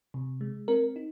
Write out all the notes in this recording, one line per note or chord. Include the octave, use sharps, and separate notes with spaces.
C3
G#3
C4 A#4
D#4